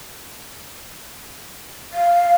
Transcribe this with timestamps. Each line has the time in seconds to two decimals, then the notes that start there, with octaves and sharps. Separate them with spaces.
1.94 F5